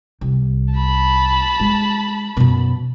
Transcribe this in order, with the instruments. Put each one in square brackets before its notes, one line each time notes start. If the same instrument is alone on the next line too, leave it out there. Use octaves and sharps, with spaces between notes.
[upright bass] C2
[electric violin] A5 B5
[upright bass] G#3
F#2 B2